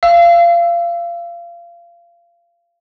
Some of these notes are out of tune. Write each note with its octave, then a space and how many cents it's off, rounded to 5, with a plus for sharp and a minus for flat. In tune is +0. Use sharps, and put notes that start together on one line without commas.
F5 -25 E6 +0